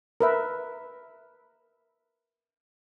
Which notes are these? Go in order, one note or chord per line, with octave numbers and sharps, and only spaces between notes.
A#4 B4 E5